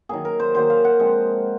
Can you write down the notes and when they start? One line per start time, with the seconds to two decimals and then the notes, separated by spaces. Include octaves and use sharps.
0.09 D#3 F#3 A#3 G#4
0.25 A#4
0.40 C5
0.54 D#3 F#3 A#3 C5
0.70 F5
0.84 F#5
0.99 F3 G#3 C4